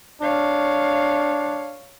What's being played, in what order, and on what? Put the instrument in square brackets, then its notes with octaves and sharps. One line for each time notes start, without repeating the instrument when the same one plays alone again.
[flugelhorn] D4 [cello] C#5 F5